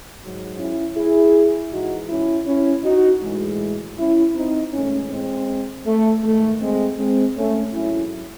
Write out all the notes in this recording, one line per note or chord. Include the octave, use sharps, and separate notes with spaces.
G#2 F#3
C#4 E4
E4 G#4
G#2 E3 G#3 D#4 F#4
C#4 E4
C#4 E4
D#4 F#4
A2 E3 G#3
C#4 E4
C4 D#4
A2 E3 G#3 A3 C#4
G#3 C4
A3
G#2 D#3 G#3 A3
G#3 C4
G#3 C4
A3 C#4
G#2 F#3 C#4 E4